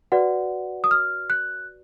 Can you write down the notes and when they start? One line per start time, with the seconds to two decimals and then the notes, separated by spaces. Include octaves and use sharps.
0.12 F#4 B4 D5 F#5
0.84 D#6
0.91 F6
1.30 F#6